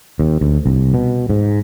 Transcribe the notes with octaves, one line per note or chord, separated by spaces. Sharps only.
D#2
D2
C2
B2
G#2